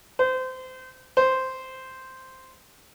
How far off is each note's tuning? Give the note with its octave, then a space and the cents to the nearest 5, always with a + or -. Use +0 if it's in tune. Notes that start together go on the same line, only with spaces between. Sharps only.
C5 -25
C5 -5